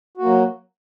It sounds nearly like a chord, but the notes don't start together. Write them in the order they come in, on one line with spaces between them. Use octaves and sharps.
F#4 A#3 F#3